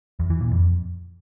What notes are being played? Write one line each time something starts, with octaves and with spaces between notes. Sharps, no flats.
E2
E3
A#2
F2